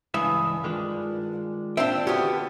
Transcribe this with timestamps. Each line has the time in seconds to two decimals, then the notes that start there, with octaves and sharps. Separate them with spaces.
0.14 C#2 G2 E3 E5 G#5 D#6
0.64 D#3 G#3 D4 F4
1.77 A#2 C4 D4 E5 F5 G5
2.07 D3 B3 C#4 F#4 G4